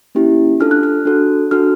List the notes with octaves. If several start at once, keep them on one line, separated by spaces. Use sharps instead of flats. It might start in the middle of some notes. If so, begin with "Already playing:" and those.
A#3 C#4 E4 G4
D4 F4 A4 F6
F#6
F6
D4 F#4 A4
D4 F#4 A4 F6